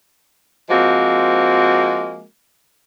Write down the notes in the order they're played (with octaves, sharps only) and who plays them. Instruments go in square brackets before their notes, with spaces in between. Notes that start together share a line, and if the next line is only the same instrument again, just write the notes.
[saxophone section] F3 G#3 A#3 C4 F#4